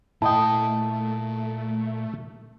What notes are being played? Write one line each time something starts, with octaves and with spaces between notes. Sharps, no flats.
A#2 A3 E4 D#5 G5 A5 C6 D#6